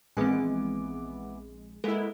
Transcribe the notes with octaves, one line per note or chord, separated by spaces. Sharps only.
A#1 E3 G#3 B3 C4 G#5 D6
G#3 A#3 B3 E4 A4 B4